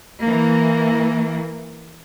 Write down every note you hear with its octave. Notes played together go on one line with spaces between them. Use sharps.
E3 A#3